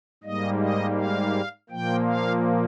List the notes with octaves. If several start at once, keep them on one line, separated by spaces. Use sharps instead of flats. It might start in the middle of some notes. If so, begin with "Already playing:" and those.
G#2 G3 A#3 D#5
D#5
F5
A#2 F3 A#3 G5
F5